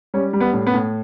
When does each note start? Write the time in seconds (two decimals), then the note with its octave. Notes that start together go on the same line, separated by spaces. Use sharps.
0.14 G3 C#4
0.33 G3
0.40 B3
0.53 A2
0.67 B3
0.74 A2